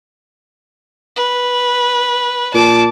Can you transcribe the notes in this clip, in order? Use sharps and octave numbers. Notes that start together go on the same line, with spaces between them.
B4
A#2 A5 D6